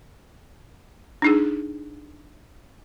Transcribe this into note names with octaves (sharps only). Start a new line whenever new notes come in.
D4 D#4 G#4